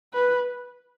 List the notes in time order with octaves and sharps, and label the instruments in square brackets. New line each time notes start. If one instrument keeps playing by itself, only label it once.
[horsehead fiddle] B4